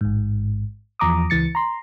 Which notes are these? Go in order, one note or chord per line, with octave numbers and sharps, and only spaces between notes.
A1 G#2
E2 F3 A#5 D6 D#6
C#2 E3 A6 C#7
A#5 C6